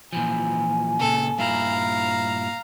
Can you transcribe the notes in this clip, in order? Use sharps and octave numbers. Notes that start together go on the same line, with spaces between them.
A#2 E3 F3 G#5
A#2 C#3 A4
G2 A#2 E4 F5 A#5